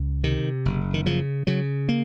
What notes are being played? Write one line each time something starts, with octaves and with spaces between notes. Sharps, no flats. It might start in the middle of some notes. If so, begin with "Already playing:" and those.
Already playing: C#2
C3 D#3
F#1
D#3
C#3 F3
C#3 F#3
A#3